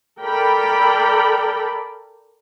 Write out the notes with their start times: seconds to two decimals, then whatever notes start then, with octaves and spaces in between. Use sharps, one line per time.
0.22 A4 A#4 D5 G5 B5